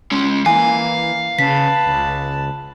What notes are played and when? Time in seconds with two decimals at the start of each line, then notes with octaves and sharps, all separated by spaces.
0.12 G#3 C#4
0.46 E3 A#3 F5 G#5
1.39 C#3 B4 A5 B6
1.86 C#2